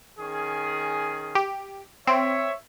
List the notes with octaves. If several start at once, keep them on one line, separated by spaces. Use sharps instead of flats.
D#3 C#4 G#4
G4
C4 C#5 E5